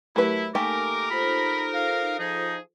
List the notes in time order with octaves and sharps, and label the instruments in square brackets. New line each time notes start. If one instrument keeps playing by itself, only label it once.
[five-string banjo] F#3 B4 [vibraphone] A3 G4 A#4 [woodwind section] E4
[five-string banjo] A3 A#3 G4 [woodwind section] D#4 A#4 [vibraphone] G#5 [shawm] D6
[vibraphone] F4 A4 C5 [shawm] B5
[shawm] F5
[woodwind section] F3 G#4 [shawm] D#4